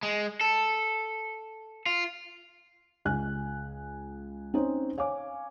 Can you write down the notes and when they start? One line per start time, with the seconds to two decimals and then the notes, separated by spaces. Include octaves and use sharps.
0.03 G#3
0.41 A4
1.86 F4
3.05 C#2 G#5 F#6
4.54 C4 C#4 D#4 C5 C#5
4.98 C#5 F5 G#5 D6